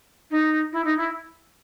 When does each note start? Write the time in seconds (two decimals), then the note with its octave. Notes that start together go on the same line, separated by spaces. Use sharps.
0.31 D#4
0.72 E4
0.84 D#4
0.97 E4